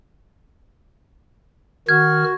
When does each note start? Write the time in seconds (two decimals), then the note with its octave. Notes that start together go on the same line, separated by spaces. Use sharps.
1.89 D#3 F#4 F6 G#6